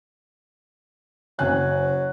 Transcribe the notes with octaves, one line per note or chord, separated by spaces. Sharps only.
F#1 F#3 G#5 F#6